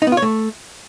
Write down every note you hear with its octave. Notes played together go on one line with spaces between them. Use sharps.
D#4
B3
F4
C#5
A3